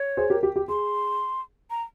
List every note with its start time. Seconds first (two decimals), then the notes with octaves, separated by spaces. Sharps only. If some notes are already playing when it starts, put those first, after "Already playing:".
Already playing: C#5
0.17 G#4 C5
0.30 G4 A#4
0.43 G4
0.56 G4
0.68 G#4 C6
1.70 A#5